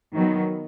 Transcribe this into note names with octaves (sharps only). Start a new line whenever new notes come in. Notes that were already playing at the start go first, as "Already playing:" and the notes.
D#3 F#3 B3